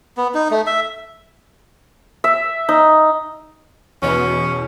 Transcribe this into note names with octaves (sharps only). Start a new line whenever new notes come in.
B3
D#4
A3
E5
E5
D#4
E2 B2 C#4